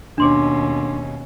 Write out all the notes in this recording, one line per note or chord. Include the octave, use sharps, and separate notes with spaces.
D#2 B2 C#4 D4 C6 D6